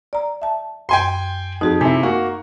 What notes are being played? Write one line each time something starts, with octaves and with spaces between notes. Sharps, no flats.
D5 A#5
E5 A5
F#2 G5 G#5 C6
F2 D#4 F#4 G#4
C3 E4 G#5
A#3 F#4